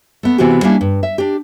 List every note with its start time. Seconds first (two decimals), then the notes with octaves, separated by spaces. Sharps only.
0.23 A3 B3
0.38 C3 E3 B3 C4 F#4 G4
0.63 G3 A#3 C#4 D4 E4
0.81 G2
1.03 E5
1.18 D4 G4